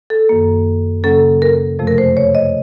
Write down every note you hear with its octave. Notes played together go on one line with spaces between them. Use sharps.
A4
F#2 D#3 A#3
C#3 F#3 A#3 C#4 A4
A#4
F2 C3 F3 A3
A#4
C5
C#5
D#5